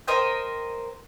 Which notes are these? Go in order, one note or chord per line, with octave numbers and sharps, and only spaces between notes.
A#4 C5 D#5 G5